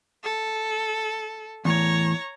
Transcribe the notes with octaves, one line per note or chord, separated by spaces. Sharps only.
A4
E2 A2 C#5 A#5